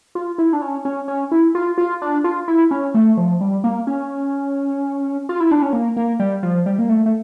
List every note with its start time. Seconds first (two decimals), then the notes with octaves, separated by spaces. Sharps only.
0.15 F4
0.38 E4
0.53 D4
0.62 C#4
0.85 C#4
1.08 C#4
1.32 E4
1.55 F4
1.78 F4
2.02 D4
2.24 F4
2.48 E4
2.71 C#4
2.94 A3
3.17 F3
3.41 G3
3.64 A#3
3.87 C#4
5.29 F4
5.40 E4
5.51 D4
5.62 C#4
5.73 A#3
5.97 A#3
6.20 G3
6.43 F3
6.66 G3
6.79 A#3
6.89 A3
7.06 A3